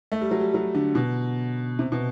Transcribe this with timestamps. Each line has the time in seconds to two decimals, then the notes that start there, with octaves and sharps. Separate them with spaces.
0.12 A3
0.21 G3
0.31 F#3
0.40 G3
0.54 F#3
0.75 D3
0.95 B2
1.79 C3
1.92 B2